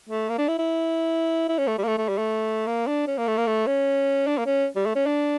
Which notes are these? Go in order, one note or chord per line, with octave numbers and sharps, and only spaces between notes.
A3
A#3
D4
E4
E4
E4
C#4
A3
G3
A#3
A3
A3
G3
A3
A#3
D4
C#4
A#3
A3
A#3
A3
C#4
D4
A#3
C#4
G3
A3
C#4
D4